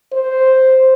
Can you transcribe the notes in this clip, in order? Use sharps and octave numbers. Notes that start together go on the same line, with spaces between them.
C5